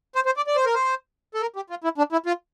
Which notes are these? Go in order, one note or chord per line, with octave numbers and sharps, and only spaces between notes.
C5
C5
D5
D5
C5
A#4
C5
A4
A#4
G4
F4
E4
D4
E4
F4